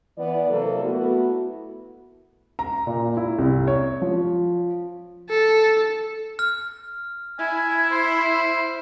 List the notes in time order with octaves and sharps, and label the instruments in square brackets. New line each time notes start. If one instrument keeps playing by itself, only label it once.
[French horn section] E3 B3 D5
C3 F#3 A#3 F#4 A4
A3 B3 E4 F#4
[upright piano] A#5
A#2
E4
C2
C#5
F3
[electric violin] A4
[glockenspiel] F6
[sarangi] E4 [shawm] G#5
[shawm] C5